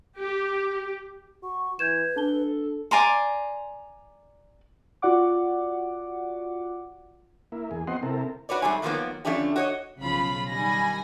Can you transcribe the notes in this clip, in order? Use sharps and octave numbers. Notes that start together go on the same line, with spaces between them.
G4
F#4 C#6
E3 B4 G6 G#6 E7
D4 A4 A5 G7
D5 G#5 A#5 C6
F4 F#4 D5 F#5 D6
A#3 E4
E2 G#4
F3 B3 C4 D#5 F#5 C6
C3 C4 E4 A4 A#4
F#4 B4 C#5 D5
G#2 G3 A3 C4 G#5
D3 D#3 F3 F#3 A#3 B3
D3 F3 A3 C#4 D4 G4
F#4 C#5 D#5
B1 C#3 F3 F#3 F4 B5
D#3 G3 G#5 B5 A#6